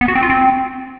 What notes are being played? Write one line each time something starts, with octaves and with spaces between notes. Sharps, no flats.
B3
F#4
C4
F4
C4